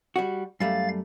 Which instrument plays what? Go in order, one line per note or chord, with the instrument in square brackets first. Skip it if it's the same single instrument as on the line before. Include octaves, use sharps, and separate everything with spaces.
[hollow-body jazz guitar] G3 F#4
[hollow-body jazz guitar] F#2 G3 A3 [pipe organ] F5 A6